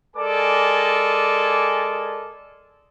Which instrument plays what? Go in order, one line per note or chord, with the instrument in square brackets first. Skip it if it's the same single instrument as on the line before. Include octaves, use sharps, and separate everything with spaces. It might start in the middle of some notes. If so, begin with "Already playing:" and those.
[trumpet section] G#3 A4 A#4 D5 G#5 D6